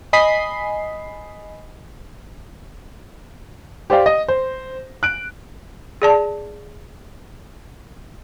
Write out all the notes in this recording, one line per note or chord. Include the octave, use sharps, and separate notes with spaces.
D#5 G#5 B5 D#6 B6 C7
G4 C5 D5 F5 G5
D#5
C5
F#6 D7
G#4 D5 A5